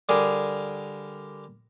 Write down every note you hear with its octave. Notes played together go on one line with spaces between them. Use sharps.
D3 G3 G#4 A#4